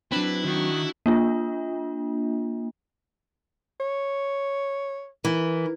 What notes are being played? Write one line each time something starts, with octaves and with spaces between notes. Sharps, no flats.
F#3 C4 D4 E4 B4
D#3 D4 F#4
A#3 D4 F4
C#5
E3 A#4